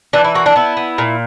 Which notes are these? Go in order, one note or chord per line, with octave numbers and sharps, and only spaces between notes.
E3 D4
E4
A#3 F#4
D4
B3 E4
B3
A#2